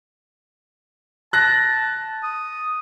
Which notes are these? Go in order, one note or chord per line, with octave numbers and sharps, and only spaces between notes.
A5 F#6 A#6
D#6